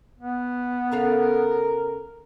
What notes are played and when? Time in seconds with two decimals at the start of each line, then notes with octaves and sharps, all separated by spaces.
0.20 B3
0.92 C#3 A4 A#4 F5